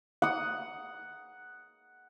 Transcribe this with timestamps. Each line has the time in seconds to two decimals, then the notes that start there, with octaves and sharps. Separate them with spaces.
0.22 F#5 D#6